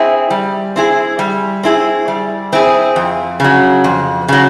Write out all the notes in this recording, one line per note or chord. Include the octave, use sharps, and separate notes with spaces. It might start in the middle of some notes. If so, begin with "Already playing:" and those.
Already playing: C4 E4 G#4
G3
C4 E4 G#4
G3
C4 E4 G#4
G3
C4 E4 G#4
F2
C#3 F#3
F2
C#3 F#3